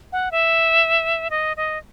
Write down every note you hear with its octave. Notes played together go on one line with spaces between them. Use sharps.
F#5
E5
D#5
D#5